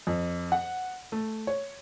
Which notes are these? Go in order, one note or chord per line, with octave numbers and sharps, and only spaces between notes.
F2
F#5
A3
C#5